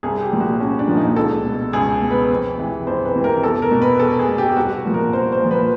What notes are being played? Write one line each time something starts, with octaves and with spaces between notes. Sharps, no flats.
C2 G#4
G4
A#2 F3
F#4
C2 C#4
D4
A#2 F3
D#4
C#2 A4
B2
C#2 G#4
B2
B4
F2
C3 E3
F2 C5
B4
C3 E3
A#4
E2 A4
A#4
B2
B4
E2 A4
G#4
B2
G4
C2 F#4
A#2 F3
A#4
C2 C5
C5
A#2 F3
B4